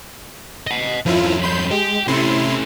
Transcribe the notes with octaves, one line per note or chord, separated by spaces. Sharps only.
D#5 F#5
F2 F3 C#4 E4 F4
B5 C6 G6
G#3 G4
C3 A3 C#4 E4 C6